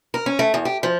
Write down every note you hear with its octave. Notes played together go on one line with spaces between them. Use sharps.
A#4
C#4
A3
E2
G4
F3